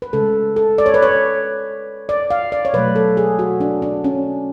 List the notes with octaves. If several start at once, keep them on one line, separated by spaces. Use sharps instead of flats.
B4
C#3 G#3 A4
A4
D5
C#5
B4
C#5
D5
F5
D5
C#5
B2 F#3 A3 B4
A4
G#4
F#4
D4
D4
C#4